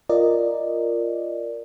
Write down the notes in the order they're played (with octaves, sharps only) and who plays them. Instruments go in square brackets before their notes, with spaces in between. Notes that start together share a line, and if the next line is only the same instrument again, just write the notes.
[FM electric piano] F4 A#4 D5 D#5